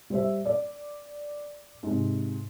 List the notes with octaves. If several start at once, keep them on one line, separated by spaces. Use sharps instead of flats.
G3 C5 E5
D5
G#2 C3